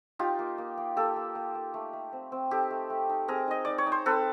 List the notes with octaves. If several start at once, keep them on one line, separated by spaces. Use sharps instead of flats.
D#4 F4 G4
A#3
A#3
A#3
A#3 G4 A4
A#3
A#3
A#3
A3
A3
C4
C4
D#4 G4 A4
A3
A3
D#4
C4 G#4 A#4
D#4 D#5
D#4 D5
C#5
D#4
C5
C4 A4 B4